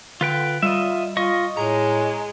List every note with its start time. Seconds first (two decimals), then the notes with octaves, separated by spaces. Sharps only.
0.21 D3 F4 B4 G5
0.62 G3 F4 D#5 E5
1.17 F4 D#5 C#6
1.57 A2 G#3 A#5